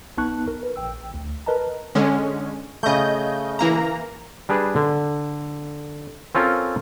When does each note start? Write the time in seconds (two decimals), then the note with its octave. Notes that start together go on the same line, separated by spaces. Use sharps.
0.17 B1 B3 D#4 A5 C#6 F#6
0.48 A#4
0.63 B4
0.76 A#1 G5 E6
1.14 D2
1.46 A#4 B4 D#5 A5 A#5
1.95 D3 G#3 C#4
2.83 C#3 A3 D#5 G6
3.59 E3 A#3 A#5
4.49 G3 D4 G#4 B4
4.76 D3
6.35 C4 C#4 F4 A4 A#4